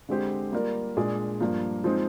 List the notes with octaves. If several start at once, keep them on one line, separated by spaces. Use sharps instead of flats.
D3 G#3 C4 G4 C5
G3 A#3 F4 A#4 D5
A#2 G#3 D4 G#4 D5
G2 F3 A#3
F3 G#3 C4 D#4